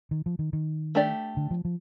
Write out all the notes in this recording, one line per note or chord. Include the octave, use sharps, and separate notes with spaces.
D#3
F3
D#3
D#3
A3 D4 G4 D5
D3
F3
F3